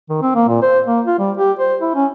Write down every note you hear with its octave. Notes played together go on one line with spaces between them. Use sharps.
D#3
C4
A#3
A#2
C5
A#3
F4
G3
G4
C5
E4
C#4